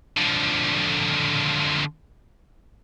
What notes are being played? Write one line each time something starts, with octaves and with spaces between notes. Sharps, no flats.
D3 F3